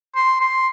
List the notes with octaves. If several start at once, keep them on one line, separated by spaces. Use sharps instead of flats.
C6
C6